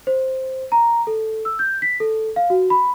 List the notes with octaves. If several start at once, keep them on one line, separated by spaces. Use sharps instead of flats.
C5
A#5
A4
E6
G6
B6
A4
F5
F#4
B5